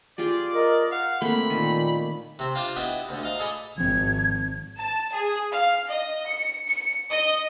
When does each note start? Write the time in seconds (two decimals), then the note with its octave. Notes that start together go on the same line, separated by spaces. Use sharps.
0.18 F4 G4 G#4 D5
0.55 A#4 D#5
0.92 F5 F#5
1.22 A3 A#3 C4 B5
1.50 A#2 D#3
2.39 C3 C4
2.55 D4 F4 C5 D5
2.76 B3 D4 E4 F#4 G4 D#5
3.09 D2 D3
3.23 D#5 F5 A#5
3.39 G#4 A4 D#5 G#5 B5 D6
3.78 G#1 F3 C4 G#6
4.78 A5
5.13 G#4
5.51 F5
5.89 D#5
6.28 C#7
6.67 C#7
7.10 D#5